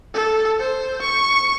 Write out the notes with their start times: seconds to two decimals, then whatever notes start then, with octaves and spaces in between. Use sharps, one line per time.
0.14 A4
0.60 C5
1.01 C#6